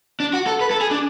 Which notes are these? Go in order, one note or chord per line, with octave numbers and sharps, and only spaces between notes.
D4
F#4
A4
B4
A4
G#4
D4